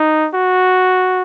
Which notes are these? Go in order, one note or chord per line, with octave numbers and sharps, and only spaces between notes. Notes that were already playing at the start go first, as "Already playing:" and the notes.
Already playing: D#4
F#4